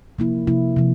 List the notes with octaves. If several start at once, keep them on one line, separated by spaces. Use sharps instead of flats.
C3 F3 A#3 E4
C3 F3 A#3 E4
C3 F3